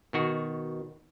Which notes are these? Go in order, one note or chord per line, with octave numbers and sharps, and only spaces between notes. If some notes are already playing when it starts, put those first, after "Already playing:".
B2 D#3 F#4